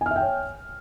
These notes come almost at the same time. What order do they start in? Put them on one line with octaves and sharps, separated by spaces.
G#5 F6 E5 G5 C#5